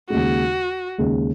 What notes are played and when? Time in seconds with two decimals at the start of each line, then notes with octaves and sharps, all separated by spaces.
0.10 D#2 C#3 G#3 F#4
0.98 D#2 C#3 G#3